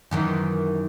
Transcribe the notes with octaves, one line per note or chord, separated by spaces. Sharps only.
F#2 D#3 E3